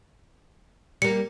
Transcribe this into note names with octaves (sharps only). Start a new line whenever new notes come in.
G3 A#3 C#7